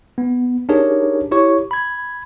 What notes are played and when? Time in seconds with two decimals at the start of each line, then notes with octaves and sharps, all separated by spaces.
0.18 B3
0.69 D4 D#4 G4 G#4 A#4 C#5
1.31 E4 G4 C#5 C#6
1.71 B5 G#6